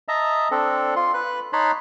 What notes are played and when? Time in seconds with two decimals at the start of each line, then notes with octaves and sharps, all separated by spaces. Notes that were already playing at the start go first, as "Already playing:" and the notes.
0.08 D#5 E5 A5 A#5
0.51 C4 D4 A4
0.96 F4 C6
1.14 B4 F#6
1.53 D#4 C#5 A5 B5 C6 F#6